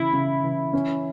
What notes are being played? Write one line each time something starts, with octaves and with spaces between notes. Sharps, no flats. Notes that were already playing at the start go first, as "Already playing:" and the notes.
Already playing: C#3 E3 E4
C#3
E3
C#4